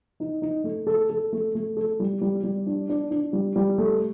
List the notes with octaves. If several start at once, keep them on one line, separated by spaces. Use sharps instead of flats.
D#4
D#4
A3
A4
A4
A3
A3
A4
G3
G3
G3
D4
D4
D4
G3
G3
A3